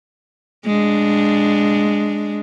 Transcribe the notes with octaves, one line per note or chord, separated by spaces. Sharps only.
G#3 D4